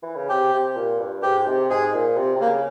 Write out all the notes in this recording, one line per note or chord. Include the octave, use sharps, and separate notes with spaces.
E3
C#3
C3 G4
C3
A#2
G2
G#2 G4
C3
G#2 G#4
A#2
C3
C3
C#3 A#3